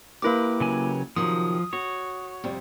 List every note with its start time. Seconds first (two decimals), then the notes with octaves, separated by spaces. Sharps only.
0.22 A#3 E4 G4 A#4 B4 D6
0.60 C#3 F#3 G#5
1.16 C3 D#3 F3 F#3 D#6
1.73 F#4 C#5
2.44 F2 C3 G3